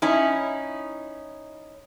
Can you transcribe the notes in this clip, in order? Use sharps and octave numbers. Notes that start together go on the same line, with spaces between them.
C#4 D#4 E4